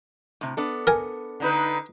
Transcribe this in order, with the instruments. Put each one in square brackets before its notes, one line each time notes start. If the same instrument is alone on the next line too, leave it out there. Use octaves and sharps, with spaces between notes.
[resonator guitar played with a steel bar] A2 C3
B3 D4 A4
[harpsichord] A#4 G#5
[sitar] D3 D#4 B4